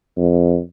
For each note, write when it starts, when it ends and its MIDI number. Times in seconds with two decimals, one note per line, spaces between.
0.17 0.58 41